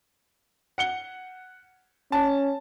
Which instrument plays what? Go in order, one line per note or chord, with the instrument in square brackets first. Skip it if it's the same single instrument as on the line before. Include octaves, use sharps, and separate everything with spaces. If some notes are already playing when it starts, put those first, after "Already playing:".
[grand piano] F#5 C#7 G7
[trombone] C#4 [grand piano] A5